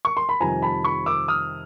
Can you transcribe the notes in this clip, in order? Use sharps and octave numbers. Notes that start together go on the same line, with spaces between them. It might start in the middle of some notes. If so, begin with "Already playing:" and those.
C#6
C6
B5
F2 C3 D#3 G3 G#5 A#5
A5 B5
B5 C#6
D6 E6
D#6 F6